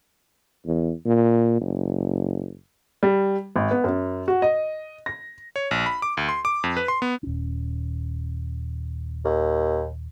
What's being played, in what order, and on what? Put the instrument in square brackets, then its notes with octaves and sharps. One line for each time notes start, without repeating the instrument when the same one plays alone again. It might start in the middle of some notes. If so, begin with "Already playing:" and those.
[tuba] E2
A#2
F#1
[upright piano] G3
G#1
B3
F#2
F#4
D#5
A#6
[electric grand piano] C#5
A#1
B5
D6
D2
C6
D6
F2
B4
C6
B3
[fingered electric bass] D#1 C#4
[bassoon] D#2